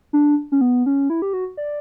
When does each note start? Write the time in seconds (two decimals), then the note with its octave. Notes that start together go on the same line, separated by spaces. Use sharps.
0.13 D4
0.52 C#4
0.61 B3
0.86 C#4
1.10 E4
1.22 G4
1.33 F#4
1.57 D5